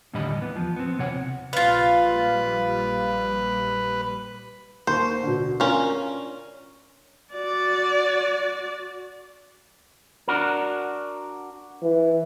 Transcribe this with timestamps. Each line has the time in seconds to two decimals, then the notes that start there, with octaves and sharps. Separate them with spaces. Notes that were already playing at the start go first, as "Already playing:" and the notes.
0.13 D#2 A2 D3 G3 D#5 B5
0.38 E2 B3
0.56 F3
0.76 B3 C4
0.98 D#2 C3 C#5 F#5
1.53 A#1 G3 F4 B4 F5
4.87 D#2 C5 C#6
5.23 B2 D3
5.60 C#4 D4 F4 A#4
7.33 F#4 D5
10.28 D4 F#4 A#4
11.83 E3